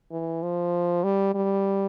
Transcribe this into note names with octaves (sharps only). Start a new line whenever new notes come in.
E3
F3
G3
G3